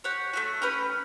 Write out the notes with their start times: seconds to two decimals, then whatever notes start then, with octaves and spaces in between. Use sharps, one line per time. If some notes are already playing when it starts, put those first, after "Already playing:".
0.04 G4 C#5 F#5
0.33 A3 C#4 F#4
0.62 C#4 G4 B4